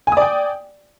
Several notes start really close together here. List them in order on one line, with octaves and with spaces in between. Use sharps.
G#5 D#6 D5 G5